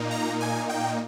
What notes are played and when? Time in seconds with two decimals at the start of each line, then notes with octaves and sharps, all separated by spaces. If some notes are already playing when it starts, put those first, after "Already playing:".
Already playing: A#2 A#3 D#4
0.11 A#5
0.40 G#5
0.69 G5